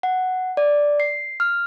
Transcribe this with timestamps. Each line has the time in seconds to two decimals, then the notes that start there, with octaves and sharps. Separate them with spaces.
0.03 F#5
0.57 D5
1.00 C7
1.40 F6